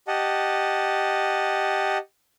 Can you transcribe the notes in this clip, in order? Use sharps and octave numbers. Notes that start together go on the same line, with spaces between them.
G4 D#5 F#5 A5